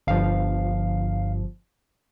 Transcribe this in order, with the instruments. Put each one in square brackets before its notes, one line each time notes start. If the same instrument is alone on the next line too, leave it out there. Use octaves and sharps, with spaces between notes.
[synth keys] G1 G2 F3 F5